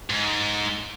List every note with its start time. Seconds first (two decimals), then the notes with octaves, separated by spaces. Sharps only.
0.10 G#2